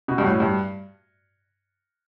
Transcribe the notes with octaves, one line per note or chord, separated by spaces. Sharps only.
B2
G2
A2
G2